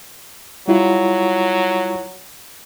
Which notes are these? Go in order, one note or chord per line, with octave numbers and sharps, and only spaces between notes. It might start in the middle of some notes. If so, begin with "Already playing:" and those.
F#3 G3 E4 F4